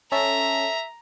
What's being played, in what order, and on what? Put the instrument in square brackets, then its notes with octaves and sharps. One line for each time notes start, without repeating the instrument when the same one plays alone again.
[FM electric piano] C#4 A4 [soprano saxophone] E5 [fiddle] A#5